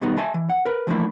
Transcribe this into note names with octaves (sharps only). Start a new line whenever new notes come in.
B2 D#3 G3 B3 D#4
D#5 E5 G#5 A5
E3
F#5
A#4 B4
E3 F3 A3 A#3 D4 E4